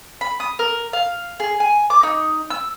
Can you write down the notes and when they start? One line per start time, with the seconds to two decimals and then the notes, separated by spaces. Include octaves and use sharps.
0.21 B5
0.40 D#6
0.59 A#4
0.93 F5
1.40 G#4
1.60 G#5
1.90 D6
2.03 D#4
2.50 E6